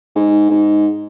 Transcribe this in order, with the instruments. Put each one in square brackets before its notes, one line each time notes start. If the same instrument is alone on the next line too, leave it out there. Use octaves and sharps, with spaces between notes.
[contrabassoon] G#2
G#2